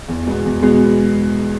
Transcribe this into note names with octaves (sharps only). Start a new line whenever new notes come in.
E2
B2 G#3 B3
E2
B2 G#3 B3